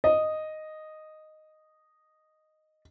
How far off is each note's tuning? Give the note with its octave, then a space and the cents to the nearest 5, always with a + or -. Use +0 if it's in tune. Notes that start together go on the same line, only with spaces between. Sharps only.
D#5 -5